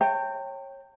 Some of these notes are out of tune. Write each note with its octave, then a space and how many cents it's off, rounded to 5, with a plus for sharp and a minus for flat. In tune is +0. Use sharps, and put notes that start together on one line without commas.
C#5 -20 G5 +0 A#5 -40